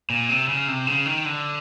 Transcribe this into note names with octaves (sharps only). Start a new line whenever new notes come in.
A#2
C3
C#3
C3
C#3
D#3
D3